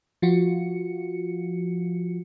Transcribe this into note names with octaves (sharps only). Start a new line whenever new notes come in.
F3 F4 F#4 C#7